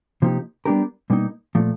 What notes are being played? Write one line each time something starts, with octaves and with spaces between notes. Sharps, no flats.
C3 F3 A#3 D#4 G4
G3 B3 D4 G4 A#4
B2 G3 A#3 D#4
A#2 F3 A3